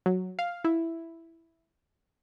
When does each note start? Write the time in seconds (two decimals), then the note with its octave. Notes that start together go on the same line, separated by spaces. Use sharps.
0.06 F#3
0.39 F5
0.64 E4